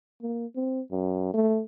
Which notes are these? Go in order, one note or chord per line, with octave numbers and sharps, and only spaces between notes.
A#3
C4
F#2
A3